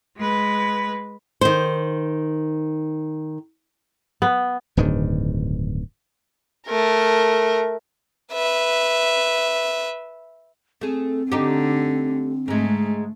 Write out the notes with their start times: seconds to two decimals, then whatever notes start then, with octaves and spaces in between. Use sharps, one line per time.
0.17 G#3 B4
1.41 D#3 C5
4.22 B3
4.77 D1 G2 D#3
6.67 A3 A#4
8.33 B4 E5
10.81 A3 C4 G#4
11.32 D3 A3 D#4 G4
12.48 G#2 G#3 A3